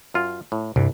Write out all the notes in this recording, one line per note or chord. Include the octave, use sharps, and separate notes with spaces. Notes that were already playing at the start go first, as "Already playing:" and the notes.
F#2 F4
A2
C2 G2 C3